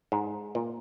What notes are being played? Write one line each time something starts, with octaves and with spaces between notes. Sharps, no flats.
G#2
A#2